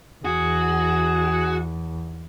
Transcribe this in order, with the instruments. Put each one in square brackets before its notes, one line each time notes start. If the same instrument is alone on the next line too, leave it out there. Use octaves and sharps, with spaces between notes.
[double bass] E2 [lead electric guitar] F#4 [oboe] G#4